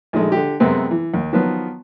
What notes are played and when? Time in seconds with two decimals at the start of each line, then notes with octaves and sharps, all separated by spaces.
0.13 A#1 D#3 G#3 A3
0.32 D3 G4
0.60 F#2 C3 G#3 B3 C4
0.91 E3
1.14 D#2
1.33 D#3 F3 F#3 B3